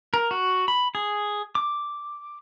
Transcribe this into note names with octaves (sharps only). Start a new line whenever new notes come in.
A#4
F#4
B5
G#4
D6